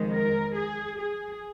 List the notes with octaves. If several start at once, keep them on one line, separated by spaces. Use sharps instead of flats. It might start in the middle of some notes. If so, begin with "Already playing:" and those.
Already playing: F2 D#3 G#3
A#4
G#4
G#4